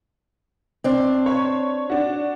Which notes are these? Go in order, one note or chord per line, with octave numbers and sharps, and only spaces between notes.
C4 D4
C#5
D4 F#4